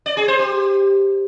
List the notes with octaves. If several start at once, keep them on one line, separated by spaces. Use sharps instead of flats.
D5
G#4
C5
G4